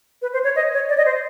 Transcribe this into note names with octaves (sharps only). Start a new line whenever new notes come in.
B4
C5
C#5
D#5
C#5
D5
D#5
C5